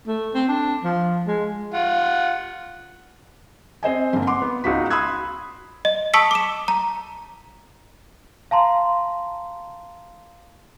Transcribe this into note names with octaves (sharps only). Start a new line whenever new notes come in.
A3
C4
D4
F3
G#3
F4 F#5
C4 C5 D#5 G#5
G2 D3 A#3
F#5 C6 D6
B3
C#2 D#4 F#4 B6
B5 C6 D#6 E6 F#6 G#6
D#5
A5 C#6 D#6 E6 B6 C#7
D6 E7
A#5
F5 A5 A#5 C6